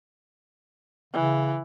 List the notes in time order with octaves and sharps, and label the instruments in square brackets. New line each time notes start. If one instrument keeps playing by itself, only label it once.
[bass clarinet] C#3 [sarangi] E3